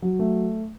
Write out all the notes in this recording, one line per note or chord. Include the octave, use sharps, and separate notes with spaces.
F#3
A3